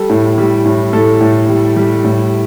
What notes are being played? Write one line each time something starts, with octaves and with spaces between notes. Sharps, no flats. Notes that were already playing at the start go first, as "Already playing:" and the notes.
Already playing: G3 A4
A2
G3
A2
A2 A4
A2
G3
G3
A2